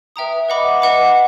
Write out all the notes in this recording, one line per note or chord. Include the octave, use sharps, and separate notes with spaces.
B4 E5 G5 A#5 D#6
B4 D#5 F#5 B5 D6
B4 D#5 F#5 B5 D6